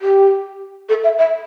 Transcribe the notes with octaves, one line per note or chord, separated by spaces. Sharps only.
G4
A4
E5
E5